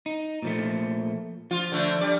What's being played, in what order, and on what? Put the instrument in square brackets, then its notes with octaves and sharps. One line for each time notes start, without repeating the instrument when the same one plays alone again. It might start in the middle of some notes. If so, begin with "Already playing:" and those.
[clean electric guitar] D#4
A#2 F3 A3
[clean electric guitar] F3 [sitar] F4
[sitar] D3 A3
[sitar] G3 [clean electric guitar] D5